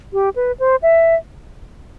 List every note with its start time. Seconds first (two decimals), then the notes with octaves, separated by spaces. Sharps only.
0.13 G4
0.36 B4
0.60 C5
0.82 E5